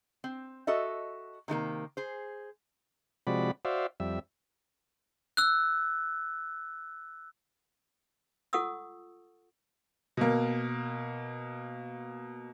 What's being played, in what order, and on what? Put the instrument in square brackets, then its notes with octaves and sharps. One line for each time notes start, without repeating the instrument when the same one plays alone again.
[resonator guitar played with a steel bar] C4
F#4 A4 D#5 E5
C3 D#3 G#3 A#3
G#4 C5
[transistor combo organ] C3 F3 G#3 F#4 D5 B5
F#4 C5 D5 E5 F5
F2 G3 E5
[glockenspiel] E6 F#6
[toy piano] F4 A4 F#5 C#6 D#6 E6
[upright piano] B2 A#3